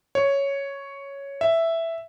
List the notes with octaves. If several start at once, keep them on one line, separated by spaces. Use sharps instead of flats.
C#5
E5